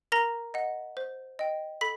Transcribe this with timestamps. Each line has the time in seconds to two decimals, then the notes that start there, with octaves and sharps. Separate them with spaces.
0.12 A#4 A#5 A#6
0.54 D#5 F#5
0.97 C5
1.39 D#5 G5
1.81 A4 B5 B6